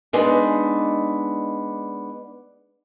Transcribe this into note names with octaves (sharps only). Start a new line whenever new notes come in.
G#3 B3 D4 D#4